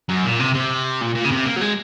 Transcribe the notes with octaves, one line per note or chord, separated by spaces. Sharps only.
F#2
A#2
C3
C3
A#2
A#2
C#3
C3
A#3
F#3
G#3